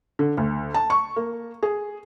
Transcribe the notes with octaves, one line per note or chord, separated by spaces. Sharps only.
D3
D2
A5
C#6
A#3
G#4